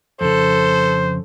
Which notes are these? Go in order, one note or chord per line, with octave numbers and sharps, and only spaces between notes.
F2 C#3 A4 C5